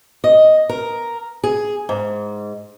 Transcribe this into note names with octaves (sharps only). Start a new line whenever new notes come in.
D#5
A#4
G#4
G#2